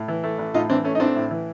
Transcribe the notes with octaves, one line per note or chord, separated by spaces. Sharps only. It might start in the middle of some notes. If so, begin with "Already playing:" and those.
Already playing: A2
E3
A3
A1
A2 D#4 F4
E3 C4 D4
A3 C#4
D#4
A1 C4 D4
A2
E3